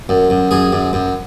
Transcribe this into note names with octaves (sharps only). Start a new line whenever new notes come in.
F#2
F#2
F#2 G#4
F#2
F#2